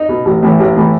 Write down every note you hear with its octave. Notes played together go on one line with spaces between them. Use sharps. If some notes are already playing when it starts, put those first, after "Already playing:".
Already playing: D#4
B2
A1
A2 E3
A1
A2 E3